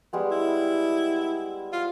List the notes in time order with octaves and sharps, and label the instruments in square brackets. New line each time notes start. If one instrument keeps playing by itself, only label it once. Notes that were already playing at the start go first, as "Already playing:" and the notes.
[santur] G3 G#3 B3
[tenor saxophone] E4
F4